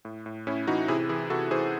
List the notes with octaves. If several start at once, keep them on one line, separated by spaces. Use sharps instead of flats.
A2
A2
A2 C#4 E4
E3 D#4 F#4
C3 E4 G#4
E3 E4 G#4
C3 F#4 A4
E3 G#4 C5